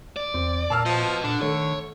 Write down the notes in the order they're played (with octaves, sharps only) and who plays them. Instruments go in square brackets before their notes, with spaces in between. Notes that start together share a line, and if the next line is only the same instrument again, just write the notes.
[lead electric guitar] D5
[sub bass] E2 [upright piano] C4
[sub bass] A#2 [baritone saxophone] A#3 [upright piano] A5 E6 F6
[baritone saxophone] F3 [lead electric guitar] B4 D#5
[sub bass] A#2 [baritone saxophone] D3 [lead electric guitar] D4
[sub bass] D#3 [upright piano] A3 [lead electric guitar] C#5